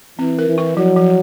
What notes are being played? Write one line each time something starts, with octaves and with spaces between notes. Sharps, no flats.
E3 C4
A#4
E3
E4
F3 F#3
F3